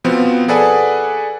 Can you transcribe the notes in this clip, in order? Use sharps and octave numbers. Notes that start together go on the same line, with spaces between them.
B2 F3 B3 C4
G#4 A4 B4 D5 F#5 G#5